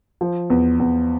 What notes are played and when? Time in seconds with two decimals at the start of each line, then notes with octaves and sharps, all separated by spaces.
0.21 F3
0.50 E2
0.80 E2